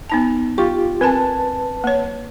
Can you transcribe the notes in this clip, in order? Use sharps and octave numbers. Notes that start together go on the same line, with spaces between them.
B3 D#4 A5
F4 G4 C#6
C4 A#4 B4 G#5 A5
A#3 C#5